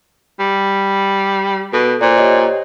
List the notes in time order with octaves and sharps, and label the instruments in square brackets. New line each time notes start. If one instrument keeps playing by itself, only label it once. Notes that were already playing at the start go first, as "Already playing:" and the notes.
[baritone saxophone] G3
[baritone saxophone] B2 [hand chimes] A4
[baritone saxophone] A#2 [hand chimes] C5 D5
[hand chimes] G4 C#5 D#5